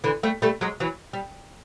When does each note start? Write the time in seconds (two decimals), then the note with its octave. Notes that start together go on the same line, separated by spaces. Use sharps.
0.04 D3 E3
0.23 G3 A3
0.42 G3 A3
0.61 F#3 G#3
0.80 E3 F#3
1.13 G3